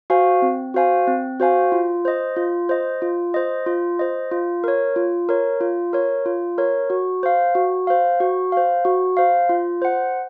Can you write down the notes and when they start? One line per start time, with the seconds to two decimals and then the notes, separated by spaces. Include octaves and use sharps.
0.10 F#4 C5 F5 G#5
0.42 C4
0.74 F#4 C5 F5 G#5
1.07 C4
1.40 F#4 C5 F5 G#5
1.72 F4
2.05 C5 D#5
2.36 F4
2.69 C5 D#5
3.02 F4
3.34 C5 D#5
3.66 F4
3.99 C5 D#5
4.31 F4
4.64 A#4 C#5
4.96 F4
5.29 A#4 C#5
5.61 F4
5.93 A#4 C#5
6.26 F4
6.58 A#4 C#5
6.90 F#4
7.23 C5 F5
7.55 F#4
7.87 C5 F5
8.20 F#4
8.52 C5 F5
8.85 F#4
9.17 C5 F5
9.49 F4
9.82 C5 F#5